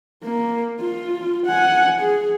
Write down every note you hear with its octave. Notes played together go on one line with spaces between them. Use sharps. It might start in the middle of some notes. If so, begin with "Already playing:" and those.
A#3
F4
F#5 G#5
G#4